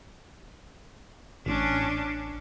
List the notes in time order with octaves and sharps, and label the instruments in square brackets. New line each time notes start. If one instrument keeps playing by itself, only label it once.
[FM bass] A1 [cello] C#4 D4